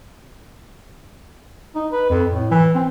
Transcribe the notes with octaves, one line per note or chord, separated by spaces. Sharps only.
D#4
B4
F2
A2
E3
C4